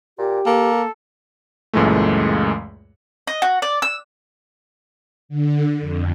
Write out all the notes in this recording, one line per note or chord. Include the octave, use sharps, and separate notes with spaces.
A#2 G4
A#3 A4
C#2 F#2 A#2 E3 G#3 A3
D#5
F#4
D5
E6
D3
F2